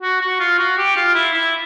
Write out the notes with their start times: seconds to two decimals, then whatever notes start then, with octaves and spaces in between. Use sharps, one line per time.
0.02 F#4
0.21 F#4
0.40 F4
0.59 F#4
0.77 G4
0.96 F4
1.15 E4
1.34 E4